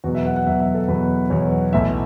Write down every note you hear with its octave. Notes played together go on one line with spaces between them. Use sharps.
E2 B2 F#3 F#4
E5
F#5
F#5
E2 B2 F#3 E5
E5
A4
E2 B2 F#3 B4
E2 B2 F#3 C#5
B1 A2 E3 E5